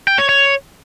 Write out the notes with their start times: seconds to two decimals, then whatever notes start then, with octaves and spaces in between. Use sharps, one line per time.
0.08 G5
0.18 C#5
0.29 C#5